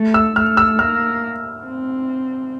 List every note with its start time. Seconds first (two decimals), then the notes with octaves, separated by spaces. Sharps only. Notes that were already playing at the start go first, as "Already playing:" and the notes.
Already playing: A3
0.14 E6
0.36 A3 F6
0.57 E6
0.79 A#3 F6
1.65 C4